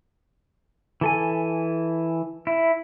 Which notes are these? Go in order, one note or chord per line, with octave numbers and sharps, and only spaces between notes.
E3 A4 G#5
E4